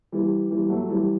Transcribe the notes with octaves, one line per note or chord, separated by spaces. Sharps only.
E3 G3
E3 G3
F#3 A3
E3 G3